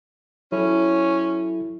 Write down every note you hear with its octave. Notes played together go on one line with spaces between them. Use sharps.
F#3 C#4 E4 A4